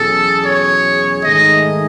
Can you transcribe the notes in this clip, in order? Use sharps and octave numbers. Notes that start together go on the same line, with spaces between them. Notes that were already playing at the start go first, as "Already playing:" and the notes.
Already playing: E2 B2 F#3 C#4 G#4 A4
C#5
G#2 D#3 A3 D#4 G#4 D#5